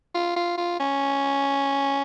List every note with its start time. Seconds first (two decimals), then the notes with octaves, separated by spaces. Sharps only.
0.15 F4
0.36 F4
0.58 F4
0.80 C#4